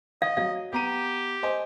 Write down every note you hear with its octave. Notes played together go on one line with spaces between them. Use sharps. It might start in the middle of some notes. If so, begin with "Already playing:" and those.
D#5 F5
F#3 F5
B3 G4 A#5 D#7
C5 D#5 G#5